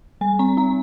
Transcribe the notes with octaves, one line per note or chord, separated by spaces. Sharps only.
G3 G#5
C4 A#5
D#4 A#5